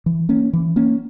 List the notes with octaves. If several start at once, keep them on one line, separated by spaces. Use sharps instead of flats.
E3
A#3 C#4
E3
A#3 C#4